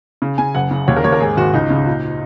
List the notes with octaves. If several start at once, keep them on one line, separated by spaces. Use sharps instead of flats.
C#3
C#3 G#5
F#1 F#5
C#3
D#2 C#5
A#4
D#2 C#5
A#4
G#2 G#4
G#1 F#4
C#2 D#4
C#3
A#2